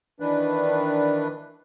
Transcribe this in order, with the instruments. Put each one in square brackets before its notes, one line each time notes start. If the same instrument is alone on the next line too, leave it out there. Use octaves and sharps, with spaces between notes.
[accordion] D#3 E3 D4 B4